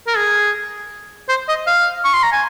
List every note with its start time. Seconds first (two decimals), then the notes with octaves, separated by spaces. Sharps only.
0.07 A#4
0.17 G#4
1.29 C5
1.48 D#5
1.67 F5
2.04 C#6
2.14 C6
2.23 A#5
2.32 G#5